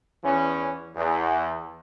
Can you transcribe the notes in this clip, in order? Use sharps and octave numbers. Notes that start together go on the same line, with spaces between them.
E2 E3 C#4
E2